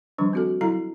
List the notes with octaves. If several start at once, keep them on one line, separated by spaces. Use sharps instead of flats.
D#3 F3 G3 D4
C4 F#4 A4
F#3 E4 A4 F5 A#5